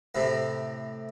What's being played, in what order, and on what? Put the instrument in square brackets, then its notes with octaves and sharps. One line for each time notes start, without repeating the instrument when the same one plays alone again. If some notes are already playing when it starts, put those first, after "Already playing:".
[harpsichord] A2 C3